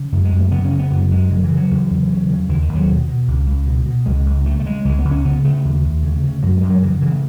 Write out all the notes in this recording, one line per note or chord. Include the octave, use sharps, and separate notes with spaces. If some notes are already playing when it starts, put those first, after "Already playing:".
Already playing: C#3
F#2 A3
G#3
F#2
A3
C#3 B3
C#4
C#3
B3
F#2 B3
F#2 G#3
C#3 F#3
E3
C#3
F#3
E2
E2
C#3
C#3
D#2 E3
D#3
D#2
F#3
B2
B2
C#2
C#2
B2
B2
C#2 G#3
C#2
C#3 A3
A3
C#3 G#3
C#2 G#3
B3
C#2
C#4
C#3 B3
C#3 A3
D#2
D#2
C#3
C#3
F#2 F#3
G#3
F#2
F#3
C#3 E3
D#3
C#3 E3
A3